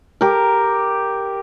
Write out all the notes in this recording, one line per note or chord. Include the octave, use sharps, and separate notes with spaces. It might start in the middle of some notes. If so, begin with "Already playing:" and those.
G4 A#4